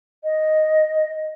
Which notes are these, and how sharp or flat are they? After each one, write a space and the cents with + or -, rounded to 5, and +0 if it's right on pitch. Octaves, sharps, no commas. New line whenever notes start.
D#5 +0